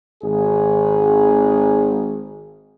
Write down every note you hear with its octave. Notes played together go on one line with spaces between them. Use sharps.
G#1 G#4